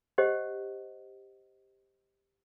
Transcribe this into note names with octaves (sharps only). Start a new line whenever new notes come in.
G4 C5 D#5 F#5